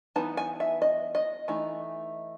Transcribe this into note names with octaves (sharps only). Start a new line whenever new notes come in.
E3 B3 D#4 A5
G#5
E5
D#5
D#5
E3 A3 D#4